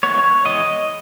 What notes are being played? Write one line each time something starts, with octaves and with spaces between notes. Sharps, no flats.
E3 G#3 B3 C#5
E3 G#3 B3 D#5